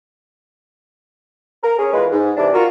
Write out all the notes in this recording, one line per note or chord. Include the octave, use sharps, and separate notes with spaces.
A#4
C#4 G#4 C#5
E2 G#3 F4 B4
G#2
C3 E3 D4
F4 F#4 A#4